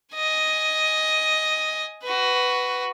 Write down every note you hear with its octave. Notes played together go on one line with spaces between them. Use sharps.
D#5 G#5
F#4 B4